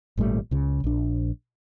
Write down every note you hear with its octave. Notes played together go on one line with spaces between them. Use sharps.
G#1 A#2 G3 A3
C#2 C#3
A#1 D4